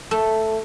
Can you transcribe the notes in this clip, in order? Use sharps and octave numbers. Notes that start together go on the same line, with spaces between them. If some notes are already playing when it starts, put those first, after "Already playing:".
A3